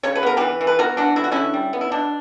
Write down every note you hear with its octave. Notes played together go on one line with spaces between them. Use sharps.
C#3 C#5
B4
B3 A#4
E3 G4 B4
E3
B4
B3 F#4 A#4
E3 D4 F#4
D3 E4
F#4
D3 C#4 E4
G3
B3
E4
B2 D4